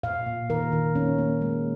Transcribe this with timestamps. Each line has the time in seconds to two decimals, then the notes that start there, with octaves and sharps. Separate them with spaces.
0.03 A#2 F5
0.26 A#2
0.49 D#3 A#4
0.72 D#3
0.95 A#3 C#4
1.18 A#3
1.41 G#3